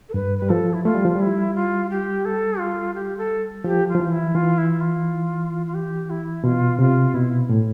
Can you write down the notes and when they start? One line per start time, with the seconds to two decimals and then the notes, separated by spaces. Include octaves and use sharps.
0.09 A4
0.14 G2 B4
0.38 G3 B4
0.49 F3 A4
0.74 E4
0.84 A3 F4
0.94 G3
1.05 F3
1.16 G3 E4
1.55 F4
1.90 G4
2.25 A4
2.59 F4
2.94 G4
3.17 A4
3.64 F3 G4
3.88 F4
3.95 F3
4.00 E3
4.12 E4
4.35 E3 F4
4.58 E4
4.81 F4
5.66 F4
5.74 G4
6.10 E4
6.44 B2 F4
6.79 C3 F4
7.14 B2 E4
7.49 A2